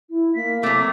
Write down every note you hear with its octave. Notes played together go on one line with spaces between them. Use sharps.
E4
A#3 B6
F#3 A3 C4 D6